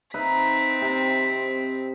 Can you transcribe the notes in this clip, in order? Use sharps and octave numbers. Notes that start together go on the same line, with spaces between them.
C4 D#4 B4 E5 B6
C3